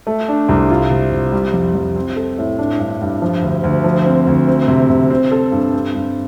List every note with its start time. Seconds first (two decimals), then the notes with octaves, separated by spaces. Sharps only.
0.07 A3
0.28 D4
0.49 C2
0.70 F4
0.91 C3
1.12 C3
1.32 G3
1.53 F2
1.75 F2
1.96 C4
2.16 A4
2.38 A2
2.58 D4
2.79 G2
3.01 G2
3.22 F3
3.42 D2
3.64 D2
3.84 F3
4.06 C4
4.27 D2
4.48 C4
4.68 C3
4.90 C3
5.10 C4
5.32 A4
5.52 G2
5.74 C4
5.95 G2